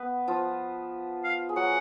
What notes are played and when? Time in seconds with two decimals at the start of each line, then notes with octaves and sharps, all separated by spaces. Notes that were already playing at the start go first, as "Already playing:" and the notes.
Already playing: B3 B4
0.28 F3 F4
1.24 F5
1.49 G#4
1.56 F#3 F#4 F#5